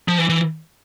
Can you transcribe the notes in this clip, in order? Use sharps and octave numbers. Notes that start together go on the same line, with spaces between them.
F3
E3
E3